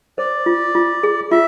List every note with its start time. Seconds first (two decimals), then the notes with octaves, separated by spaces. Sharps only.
0.18 C5 D5
0.46 F4
0.75 F4
1.03 G#4
1.31 F4 E5